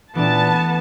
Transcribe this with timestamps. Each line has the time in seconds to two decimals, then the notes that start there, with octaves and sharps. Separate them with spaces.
0.15 A#2 E3 A3 B3 D4 A5